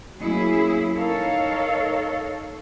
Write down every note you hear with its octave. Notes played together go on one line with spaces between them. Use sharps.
F#3 A#3 C#4 E4 G#4
D#4 A4 A#4 C#5 F5